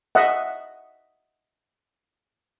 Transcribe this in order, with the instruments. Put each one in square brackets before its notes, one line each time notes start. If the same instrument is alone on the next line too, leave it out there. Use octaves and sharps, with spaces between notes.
[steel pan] D#5 E5 F#5